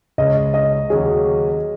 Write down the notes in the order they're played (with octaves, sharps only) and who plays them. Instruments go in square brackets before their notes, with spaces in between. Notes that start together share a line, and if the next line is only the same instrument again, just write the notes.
[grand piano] C#2 C#3 G#3 C#4 [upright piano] D#5
[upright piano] D#5
[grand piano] D#2 C#3 F#3 C#4 [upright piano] G#4